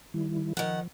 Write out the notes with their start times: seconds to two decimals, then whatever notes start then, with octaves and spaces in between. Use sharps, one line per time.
0.14 D#3 G3 E4
0.57 D#3 F3 F#5